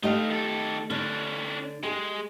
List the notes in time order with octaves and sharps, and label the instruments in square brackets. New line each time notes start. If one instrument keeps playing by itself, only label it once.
[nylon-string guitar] A3 G4 D#5 [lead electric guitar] D#4 F5
[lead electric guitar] D#3 A4
[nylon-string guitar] D3 [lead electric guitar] C#4 D4
[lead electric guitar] G#3 [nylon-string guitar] G4 G#4